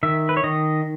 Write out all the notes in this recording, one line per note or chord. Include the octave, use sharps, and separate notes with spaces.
D#3 E5
B4
C#5
D#3 D#5